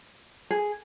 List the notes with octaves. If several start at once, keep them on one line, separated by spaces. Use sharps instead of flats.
G#4